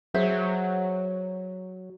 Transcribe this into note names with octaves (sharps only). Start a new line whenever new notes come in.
F#3 G#4 C5 E5